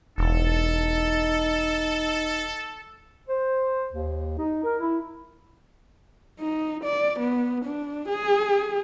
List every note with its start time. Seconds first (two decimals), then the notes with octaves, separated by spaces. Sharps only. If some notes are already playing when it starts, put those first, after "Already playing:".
0.18 E1 D#4 A4
3.28 C5
3.92 D#2
4.39 D#4
4.64 A#4
4.80 E4
6.39 D#4
6.84 D5
7.19 B3
7.65 D4
8.08 G#4